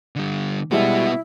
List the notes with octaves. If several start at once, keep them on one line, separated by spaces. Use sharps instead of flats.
D3 G3
B2 G3 G#3 B3 E4 F#4